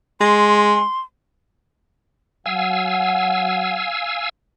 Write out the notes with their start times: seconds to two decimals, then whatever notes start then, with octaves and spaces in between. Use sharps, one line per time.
0.21 G#3 C6
2.46 F#3 F5 F#5 G#5 E6